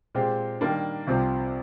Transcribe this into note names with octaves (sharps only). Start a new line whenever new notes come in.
A#2 G#3 C4 G4
D#3 G3 A#3 D4
C2 C3 F3 C4 F4